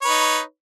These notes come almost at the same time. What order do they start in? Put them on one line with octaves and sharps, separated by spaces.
C#5 B4 D#4